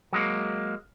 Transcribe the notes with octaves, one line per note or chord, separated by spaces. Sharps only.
F#3 G#3 A#3